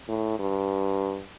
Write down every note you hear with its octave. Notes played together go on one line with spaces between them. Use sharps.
A2
G2